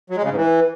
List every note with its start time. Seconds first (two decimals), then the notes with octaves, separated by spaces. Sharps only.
0.10 F#3
0.17 G#3
0.23 C#3
0.30 G#2
0.36 E3